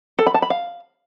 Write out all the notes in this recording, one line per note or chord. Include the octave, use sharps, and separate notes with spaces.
A4
B5
A5
B5
F5